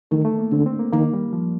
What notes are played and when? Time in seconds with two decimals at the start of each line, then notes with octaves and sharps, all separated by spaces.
0.11 D#3 A3
0.25 A3
0.39 A#3
0.52 D3 C4
0.66 C4
0.79 A#3
0.92 D#3 A#3
1.13 G3
1.33 F3